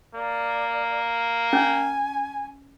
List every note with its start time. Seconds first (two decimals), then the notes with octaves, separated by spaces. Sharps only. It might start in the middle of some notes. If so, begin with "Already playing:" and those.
0.15 A#3 D5
1.53 C#4 G#5